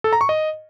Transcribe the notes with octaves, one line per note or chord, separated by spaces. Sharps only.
A4
A#5
C#6
D#5